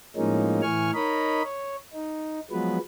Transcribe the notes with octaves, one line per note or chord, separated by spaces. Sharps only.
A2 F3 G#3 A#3 C#4 D#4
A2 E3 G#5 C#6 F6
D#4 A#4 C#5 D#5 B5
C#5
D#4
F3 F#3 G#3 B3 B4